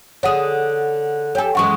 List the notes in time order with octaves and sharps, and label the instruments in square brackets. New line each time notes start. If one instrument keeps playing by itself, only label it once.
[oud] D3 G#4 [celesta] C#5 F#5
[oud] G4 A4 [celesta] C#5 G5 G#5
[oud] F#2 E3 G#3 [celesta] F#5 C#6